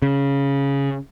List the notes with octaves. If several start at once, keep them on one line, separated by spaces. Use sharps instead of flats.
C#3